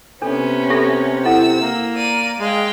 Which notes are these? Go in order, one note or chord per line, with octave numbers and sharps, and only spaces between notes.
C3 B3 C#4 D4 A4
G4 A4 E5
E4 A4 F#5 E6
A#3
D5 D#7
G#3 F5 G5